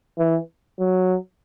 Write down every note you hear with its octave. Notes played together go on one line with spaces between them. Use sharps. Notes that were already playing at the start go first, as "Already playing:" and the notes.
E3
F#3